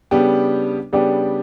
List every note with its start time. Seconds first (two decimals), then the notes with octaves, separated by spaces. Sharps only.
0.11 C#3 G3 B3 D4 G4
0.92 C#3 G3 B3 D4 G4